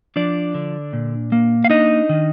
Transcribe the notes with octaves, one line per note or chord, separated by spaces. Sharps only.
F3 D4 D5
D3
A#2
A#3
F5
D4 D#4 D#5
D#3